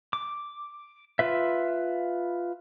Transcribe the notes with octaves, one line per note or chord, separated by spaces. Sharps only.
D6
F4 B4 E5